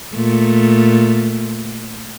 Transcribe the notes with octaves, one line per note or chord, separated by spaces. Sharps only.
A#2 A3